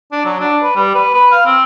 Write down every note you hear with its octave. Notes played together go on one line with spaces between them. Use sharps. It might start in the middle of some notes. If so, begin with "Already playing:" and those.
D4
F#3
D4
B4
G3
B4
B4
F5
C4